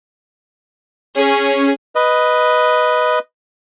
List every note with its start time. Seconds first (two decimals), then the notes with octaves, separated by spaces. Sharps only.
1.15 C#4 G#4
1.95 B4 D#5